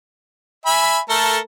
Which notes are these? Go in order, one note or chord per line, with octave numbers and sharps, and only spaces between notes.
E5 G#5 B5
A3 A4 A#4